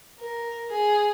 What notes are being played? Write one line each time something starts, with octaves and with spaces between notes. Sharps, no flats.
A#4
G#4